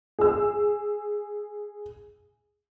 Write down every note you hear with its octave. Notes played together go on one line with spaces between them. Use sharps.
G#4 E6